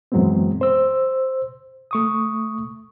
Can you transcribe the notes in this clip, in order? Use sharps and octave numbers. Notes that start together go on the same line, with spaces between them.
F#2 E3 F#3 G#3 B3 C4
C5 E6
A3 C#6 D#6